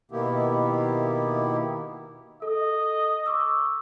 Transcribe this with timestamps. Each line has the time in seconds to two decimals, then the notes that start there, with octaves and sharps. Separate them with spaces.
0.12 B2 D#3 A#3 B3 E4 G4
2.42 A4 D#5
3.26 C#6 D6 E6